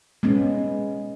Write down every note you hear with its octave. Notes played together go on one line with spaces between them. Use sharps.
G#3 B3 C#4